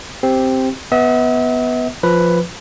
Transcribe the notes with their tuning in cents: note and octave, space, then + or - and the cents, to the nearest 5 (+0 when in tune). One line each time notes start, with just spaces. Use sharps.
C4 +0 G4 +0
B3 +0 E5 -45
F3 +0 B4 +0